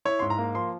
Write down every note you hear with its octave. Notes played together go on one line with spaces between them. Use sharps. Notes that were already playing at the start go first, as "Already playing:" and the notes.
E4 C#5
G#2 C6
A#5
A#3
F3 C6